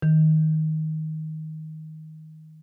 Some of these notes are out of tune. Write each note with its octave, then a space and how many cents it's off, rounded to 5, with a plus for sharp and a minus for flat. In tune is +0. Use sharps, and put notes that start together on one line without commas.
D#3 +10